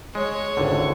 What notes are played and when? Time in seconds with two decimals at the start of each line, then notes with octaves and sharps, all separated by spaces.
0.15 G#3 C#5
0.57 G#1 C#2 D3